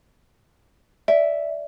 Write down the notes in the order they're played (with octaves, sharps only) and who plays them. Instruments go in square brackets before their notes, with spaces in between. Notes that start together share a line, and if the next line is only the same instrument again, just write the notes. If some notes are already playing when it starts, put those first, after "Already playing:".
[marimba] D5 [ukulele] E5